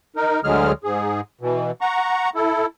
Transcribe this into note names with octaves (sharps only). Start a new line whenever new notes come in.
D#4 A#4
D2 D3 F#3 G#3 G#4 F6
G#2 G#4
B2 E3
F#5 A#5 C#6
E4 A4